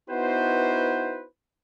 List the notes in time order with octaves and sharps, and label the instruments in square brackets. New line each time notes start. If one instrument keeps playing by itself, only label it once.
[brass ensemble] B3 D#4 E4 F#4 B4 C5